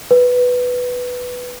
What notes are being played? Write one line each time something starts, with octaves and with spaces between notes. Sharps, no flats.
B4